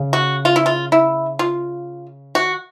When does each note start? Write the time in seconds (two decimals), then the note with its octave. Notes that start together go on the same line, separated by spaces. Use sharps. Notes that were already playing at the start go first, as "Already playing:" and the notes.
Already playing: C#3
0.13 F#4
0.45 F4
0.56 E4
0.66 F4
0.92 E4
1.39 F4
2.35 D3 F#4
2.46 D#3